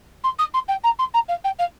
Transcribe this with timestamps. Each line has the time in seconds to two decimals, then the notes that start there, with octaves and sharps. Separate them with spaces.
0.24 C6
0.38 D#6
0.54 C6
0.68 G5
0.84 A#5
0.99 C6
1.14 A#5
1.28 F5
1.44 G5
1.59 F5